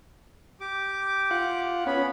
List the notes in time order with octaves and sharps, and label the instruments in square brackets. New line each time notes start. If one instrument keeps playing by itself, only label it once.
[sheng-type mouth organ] G4 D6
[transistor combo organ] F4 F#5
[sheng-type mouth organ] B3 B5 [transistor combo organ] C#4